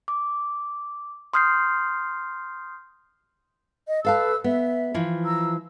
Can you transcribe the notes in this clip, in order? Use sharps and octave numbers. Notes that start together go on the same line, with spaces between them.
D6
C6 D#6 F6 G6 C7
D#5
A4 B4 F5 A5 E6
B3 E5
E3 F3
A#5 E6